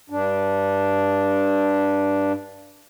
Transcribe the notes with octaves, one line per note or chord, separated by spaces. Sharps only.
G2 D4